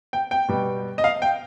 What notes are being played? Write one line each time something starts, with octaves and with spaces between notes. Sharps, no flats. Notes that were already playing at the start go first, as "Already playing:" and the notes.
G5
G5
B2 G3 B3
D#5
F5
G5